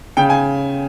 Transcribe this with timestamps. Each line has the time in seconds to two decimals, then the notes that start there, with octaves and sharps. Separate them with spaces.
0.17 C#3 G5
0.30 G#5